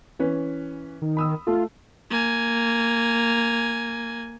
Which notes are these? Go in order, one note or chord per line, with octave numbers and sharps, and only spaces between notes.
E3 C#4 B4
D#3
B5 D#6 E6
A3 F4 A4
A#3 G#5